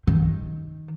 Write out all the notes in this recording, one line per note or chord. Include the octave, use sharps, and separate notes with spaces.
D#3